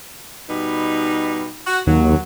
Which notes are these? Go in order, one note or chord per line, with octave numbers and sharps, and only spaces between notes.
B2 G3 D#4
F#4
D#2 F#3